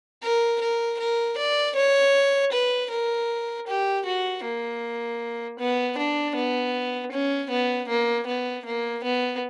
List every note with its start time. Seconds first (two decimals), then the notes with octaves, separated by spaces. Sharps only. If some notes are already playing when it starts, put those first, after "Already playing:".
0.23 A#4
0.61 A#4
1.00 A#4
1.38 D5
1.76 C#5
2.53 B4
2.91 A#4
3.67 G4
4.06 F#4
4.44 A#3
5.59 B3
5.98 D4
6.35 B3
7.12 C#4
7.50 B3
7.89 A#3
8.27 B3
8.65 A#3
9.04 B3